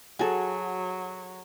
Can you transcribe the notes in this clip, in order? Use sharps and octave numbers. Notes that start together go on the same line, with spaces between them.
F#3 F#4 G#4 A4